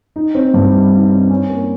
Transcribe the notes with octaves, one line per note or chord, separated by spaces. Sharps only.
D#4
C4
G2
G3
D#4
C4
C#4
A#3